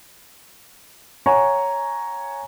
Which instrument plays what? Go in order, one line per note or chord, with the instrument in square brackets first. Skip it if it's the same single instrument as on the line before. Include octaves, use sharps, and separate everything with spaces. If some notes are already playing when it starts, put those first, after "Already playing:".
[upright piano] C#5 F#5 G#5 A#5 C#6